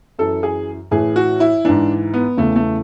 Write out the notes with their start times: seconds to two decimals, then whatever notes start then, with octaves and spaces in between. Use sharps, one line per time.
0.19 F#2 E3 A4
0.43 G#4
0.91 A2 E3 G#4
1.16 F#4
1.40 E4
1.65 G#2 E3 D4
2.14 B3
2.37 E2 C#3 E3 A3
2.56 A3